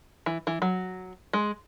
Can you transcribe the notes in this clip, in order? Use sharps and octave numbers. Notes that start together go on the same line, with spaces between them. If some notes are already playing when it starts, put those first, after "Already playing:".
E3
E3
F#3
G#3